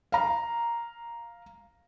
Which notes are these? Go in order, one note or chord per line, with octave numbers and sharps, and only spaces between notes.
F5 A#5